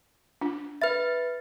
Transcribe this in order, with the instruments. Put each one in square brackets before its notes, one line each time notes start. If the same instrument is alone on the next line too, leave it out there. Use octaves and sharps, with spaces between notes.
[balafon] D4 F4
[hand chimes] B4 A6 [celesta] E5 B5 F6